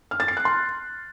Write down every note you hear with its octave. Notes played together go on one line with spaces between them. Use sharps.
F6
A6
C7
F#6
C6